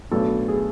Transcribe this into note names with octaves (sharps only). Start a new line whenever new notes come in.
B1 A2 F#3 B3 D4 A4
G#4